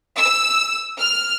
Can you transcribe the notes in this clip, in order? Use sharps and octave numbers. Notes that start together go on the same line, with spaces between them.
E6
F6